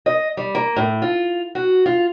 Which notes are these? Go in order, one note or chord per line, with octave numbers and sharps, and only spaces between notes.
D#5
G3
A#3
A2
F4
F#4
F4